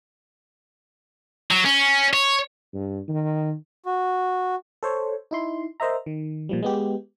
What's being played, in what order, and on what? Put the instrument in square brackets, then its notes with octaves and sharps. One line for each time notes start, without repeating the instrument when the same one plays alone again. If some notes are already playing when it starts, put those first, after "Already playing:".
[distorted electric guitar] F#3
C#4
C#5
[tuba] G2
D#3
[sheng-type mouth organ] F#4
[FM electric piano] A4 C5 C#5
D#4 E4 C6
A#4 C5 D#5 E5 A#5
D#3
A#2 F3 G3
G#3 B3 G4